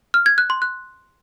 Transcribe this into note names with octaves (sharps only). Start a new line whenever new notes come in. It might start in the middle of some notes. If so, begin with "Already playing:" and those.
F6
G#6
F#6
C6
F#6